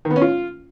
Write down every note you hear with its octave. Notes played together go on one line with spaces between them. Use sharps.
D#3
B3
C#4
F4